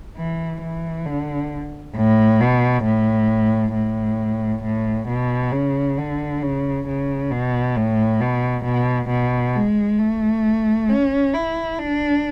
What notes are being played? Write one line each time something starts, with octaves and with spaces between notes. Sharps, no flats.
E3
E3
D3
A2
B2
A2
A2
A2
B2
C#3
D3
C#3
C#3
B2
A2
B2
B2
B2
G#3
A3
C#4
E4
D4